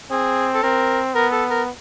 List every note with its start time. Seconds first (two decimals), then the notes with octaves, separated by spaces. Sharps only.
0.11 C4 G#4
0.54 A4
0.63 C4 A#4
1.15 B3 A#4
1.32 A4
1.50 A#4